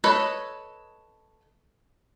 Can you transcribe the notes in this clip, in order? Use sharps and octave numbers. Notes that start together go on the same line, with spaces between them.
A4 B4 C#5 D#5